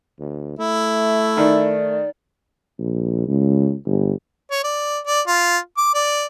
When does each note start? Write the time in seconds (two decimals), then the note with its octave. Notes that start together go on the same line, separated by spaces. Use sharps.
0.19 D2
0.59 A3 E4
1.37 D#3 D5
2.79 A#1
3.28 C#2
3.86 G1
4.51 C#5
4.64 D5
5.06 D5
5.27 F4
5.77 D6
5.94 D5